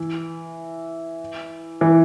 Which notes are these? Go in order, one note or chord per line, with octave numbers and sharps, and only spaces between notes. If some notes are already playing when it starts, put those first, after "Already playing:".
Already playing: E3
E3